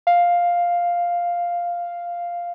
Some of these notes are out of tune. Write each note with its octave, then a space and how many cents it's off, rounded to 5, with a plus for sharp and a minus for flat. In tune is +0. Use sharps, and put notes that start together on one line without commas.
F5 +0